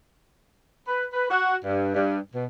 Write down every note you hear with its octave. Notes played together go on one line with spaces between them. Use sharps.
B4
B4
F#4
G2
G2
B2